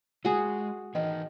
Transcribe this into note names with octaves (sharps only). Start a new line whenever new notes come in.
G#3 F#4 G#4
D#3 E3 C#5